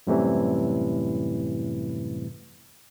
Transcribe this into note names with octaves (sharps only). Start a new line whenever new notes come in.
F#2 A2 C3 E3 G3